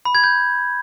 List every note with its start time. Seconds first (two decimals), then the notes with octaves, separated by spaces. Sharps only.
0.05 B5
0.15 G#6
0.24 G6